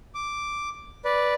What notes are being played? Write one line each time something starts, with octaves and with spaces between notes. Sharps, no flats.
D6
B4 D5